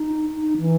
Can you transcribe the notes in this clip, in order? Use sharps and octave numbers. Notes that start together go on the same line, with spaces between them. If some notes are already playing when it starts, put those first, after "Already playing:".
Already playing: D#4
D#4
E3